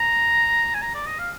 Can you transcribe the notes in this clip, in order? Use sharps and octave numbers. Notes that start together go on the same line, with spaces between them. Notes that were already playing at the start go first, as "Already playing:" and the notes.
Already playing: A#5
G#5
A#5
D5
D#5
F5